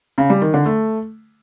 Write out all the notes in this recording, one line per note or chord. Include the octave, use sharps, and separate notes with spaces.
C#3
G3
D#3
D3
A3